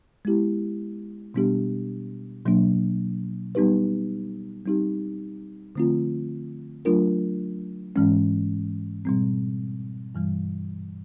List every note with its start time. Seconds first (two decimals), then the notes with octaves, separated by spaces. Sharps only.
0.25 G#3 B3 E4 G4
1.34 B2 G3 B3 D4 G4
2.46 B2 F#3 A#3 D4
3.55 G3 B3 D#4 G4 B4
4.65 G3 C4 D#4 G4
5.76 D3 F3 A3 C4 F4
6.85 F#3 A3 D4 F4 A#4
7.96 G#2 E3 G#3 C#4
9.05 B2 G3 C4
10.15 G2 E3 G3